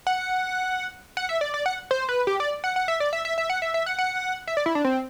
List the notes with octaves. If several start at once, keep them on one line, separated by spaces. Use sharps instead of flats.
F#5
F#5
E5
D5
D5
F#5
C5
B4
G4
D5
F#5
F#5
E5
D5
E5
E5
E5
F#5
E5
E5
F#5
F#5
E5
D5
E4
D4
C4